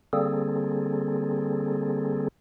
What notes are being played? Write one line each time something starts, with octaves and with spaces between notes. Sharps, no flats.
D3 G3 A#3 C4 G#4 A4